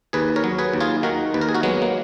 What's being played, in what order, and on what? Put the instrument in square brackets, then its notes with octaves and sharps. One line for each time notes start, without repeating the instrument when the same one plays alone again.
[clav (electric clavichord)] D#2 G#4 B4
A#4 C#5
F#3
G#4 B4
D#2
F4 G#4
D#3 F#4 A#4
D#2 B4
A#4
G#4
F#4 A#4
F#3 G#3 B3
A#3